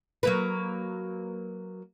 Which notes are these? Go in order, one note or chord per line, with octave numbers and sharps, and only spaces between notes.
F#3 A#3 B4